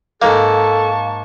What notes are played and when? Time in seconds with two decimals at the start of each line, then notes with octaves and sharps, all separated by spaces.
0.22 G#2 A#3 A4 F5 A5 C#6